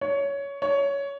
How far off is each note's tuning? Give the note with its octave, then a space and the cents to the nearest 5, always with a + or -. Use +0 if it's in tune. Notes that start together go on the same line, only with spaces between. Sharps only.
C#5 +15
C#5 +15